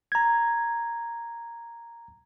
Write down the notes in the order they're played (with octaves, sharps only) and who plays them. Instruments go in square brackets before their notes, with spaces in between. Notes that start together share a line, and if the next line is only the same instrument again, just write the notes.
[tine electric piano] A#5 G#6